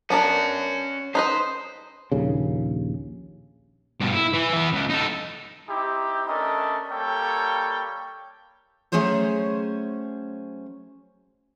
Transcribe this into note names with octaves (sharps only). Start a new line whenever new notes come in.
B3 C#4 D4 F#4 A#4
D#4 B4 C5 D#5
A#1 D#2 C#3
G2 B2
E4
E3
E3 B3
C#2
D#4 A4
C4 D#4 E4 G4
A3 C#4 D4 A#4 D#5
G3 A#3 A4 C#5 G5
F#3 A3 C#4 G#4 C5 C#5